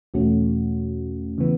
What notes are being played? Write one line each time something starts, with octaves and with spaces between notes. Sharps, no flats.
E2 B2 A3 C#4 F#4
C#3 E3 B3